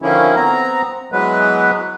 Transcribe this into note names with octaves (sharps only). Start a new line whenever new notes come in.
D3 D#3 F3 A#3 C#4 E4
B3 C4 A#5
E3 F#3 G#3 B3 B4